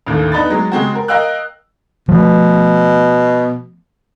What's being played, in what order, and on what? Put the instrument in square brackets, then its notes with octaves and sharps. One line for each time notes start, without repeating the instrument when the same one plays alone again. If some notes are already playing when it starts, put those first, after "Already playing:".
[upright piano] A1 D#2 D3
B3 D4 D#4 B5 A6
F#3 G#3
C#3 G#3 C4 F#4
A#4
A#4 D#5 F5 G5 E6 F#6
[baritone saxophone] B2 [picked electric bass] F3 A3 B3